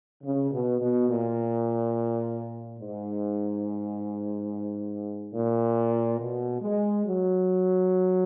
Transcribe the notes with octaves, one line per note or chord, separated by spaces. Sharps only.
C#3
B2
B2
A#2
G#2
A#2
B2
G#3
F#3